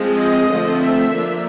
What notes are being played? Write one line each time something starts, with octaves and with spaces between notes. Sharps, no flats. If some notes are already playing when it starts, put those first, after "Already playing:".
Already playing: F3 G#3 C4
D#5
D3 F3 A3 C4
E5
F3 A#3 D4